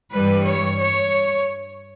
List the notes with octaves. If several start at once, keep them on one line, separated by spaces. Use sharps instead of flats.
G2 E3 G3 B4
C#5
C#5